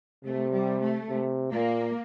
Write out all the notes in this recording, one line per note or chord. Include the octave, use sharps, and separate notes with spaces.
C3 A3
G3
A3
C3
A#2 A#3